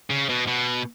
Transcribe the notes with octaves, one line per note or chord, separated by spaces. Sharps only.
C#3
B2
B2